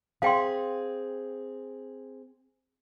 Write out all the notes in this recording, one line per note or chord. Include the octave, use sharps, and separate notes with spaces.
C4 G#4 F5 G5 C6